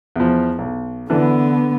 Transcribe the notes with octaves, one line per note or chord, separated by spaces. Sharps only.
E2 F3
B1
D3 E3 B3 D4 A4